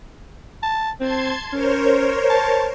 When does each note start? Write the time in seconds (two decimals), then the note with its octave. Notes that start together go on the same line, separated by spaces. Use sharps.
0.63 A5
1.00 C4 A5 C6 G#6
1.53 C#4 A#4 C5 C#5
2.30 A5